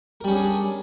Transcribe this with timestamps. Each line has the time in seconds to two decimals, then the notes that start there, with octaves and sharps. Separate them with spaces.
0.21 A#4
0.24 G3
0.28 C#4
0.31 G#4
0.35 D4